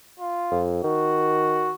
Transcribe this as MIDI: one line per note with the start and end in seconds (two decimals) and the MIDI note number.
0.19 0.64 65
0.51 0.83 41
0.83 1.71 51
0.83 1.74 66